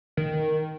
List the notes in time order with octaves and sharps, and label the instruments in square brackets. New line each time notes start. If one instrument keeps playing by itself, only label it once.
[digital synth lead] D#3